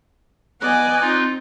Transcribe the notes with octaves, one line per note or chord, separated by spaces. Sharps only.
B3 D5 D#5 G#5 F#6
C4 D#4 F4